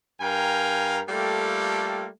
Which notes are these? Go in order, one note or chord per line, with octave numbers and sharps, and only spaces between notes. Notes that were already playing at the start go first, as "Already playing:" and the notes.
G2 A#4 F5 G5 G#5 A#5
G3 A3 A#3 F4 G4 A4